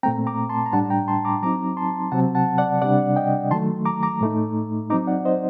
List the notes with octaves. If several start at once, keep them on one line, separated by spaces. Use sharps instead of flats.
A#2 A3 C4 G5 A#5
A#5 D6
A5 C6
A#5
A2 G3 D4 F#5 A5
G5 A#5
A5 C6
A#5 D6
F#3 C4 D#4 A#5 D6
A5 C6
C3 F#3 C4 F#5 A5
F#5 A5
D5 F#5
C3 G3 D4 D5 F#5
D#5 G5
D#3 F#3 A3 A5 C6
A#5 D6
A#5 D6
A2 A3 D#4
F#3 C4 D#4 A#5 D6
D5 F#5
C5 D#5